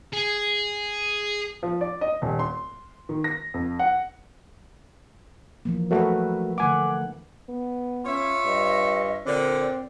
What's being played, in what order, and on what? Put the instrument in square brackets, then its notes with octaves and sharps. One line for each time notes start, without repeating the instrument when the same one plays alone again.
[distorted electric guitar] G#4
[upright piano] F3
D5
D#5
D#1
C6
D#3
A#6
F2
F#5
[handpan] E3 F3 A#3
[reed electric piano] F#3 A3 F#4 [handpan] A#4 B4 E5
[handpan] D3 A3 F#5 [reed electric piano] G#5 D6
[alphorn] B3
[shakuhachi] C#4 [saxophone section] F4 C#5 E5
[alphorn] G2 [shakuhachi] D#5
[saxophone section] A#2 D3 [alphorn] C4 [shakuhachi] D5